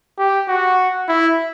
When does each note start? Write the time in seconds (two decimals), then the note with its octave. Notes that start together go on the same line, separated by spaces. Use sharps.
0.18 G4
0.48 F#4
1.08 E4